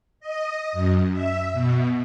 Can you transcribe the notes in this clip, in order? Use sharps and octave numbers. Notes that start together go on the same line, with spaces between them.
D#5
F#2
E5
B2